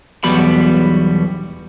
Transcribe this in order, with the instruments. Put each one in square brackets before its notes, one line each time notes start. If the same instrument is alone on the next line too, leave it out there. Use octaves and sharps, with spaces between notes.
[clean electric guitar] B1 E2 B2 G3 B3 B5